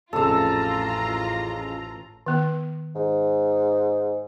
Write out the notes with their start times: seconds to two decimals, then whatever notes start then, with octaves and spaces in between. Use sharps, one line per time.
0.13 A1 F2 C#3 C#4 F4 A4 A#5 E6
2.26 D#3 B3
2.95 G#2